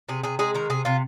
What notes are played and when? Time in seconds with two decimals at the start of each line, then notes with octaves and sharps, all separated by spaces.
0.09 C3 G#4
0.23 C3 G#4
0.39 G#3 G#4
0.55 D#3 A#4
0.70 C3 G#4
0.85 C3 F4